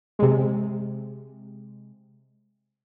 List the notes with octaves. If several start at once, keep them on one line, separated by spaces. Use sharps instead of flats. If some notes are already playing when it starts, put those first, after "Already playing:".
C3 G#3